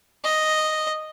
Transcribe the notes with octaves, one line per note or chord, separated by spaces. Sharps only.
D#5